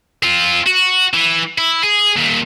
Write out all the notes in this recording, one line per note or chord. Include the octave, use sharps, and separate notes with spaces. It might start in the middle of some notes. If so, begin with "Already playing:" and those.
C4 F4
F#4
E3
E4
G#4
D#2 A#2